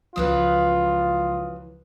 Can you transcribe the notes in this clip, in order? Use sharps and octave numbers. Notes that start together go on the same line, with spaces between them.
C#2 F#2 E3 F3 F4 B4 D#6